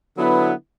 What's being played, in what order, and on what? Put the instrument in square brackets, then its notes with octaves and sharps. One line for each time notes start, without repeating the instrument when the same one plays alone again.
[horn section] D3 F#3 B3 E4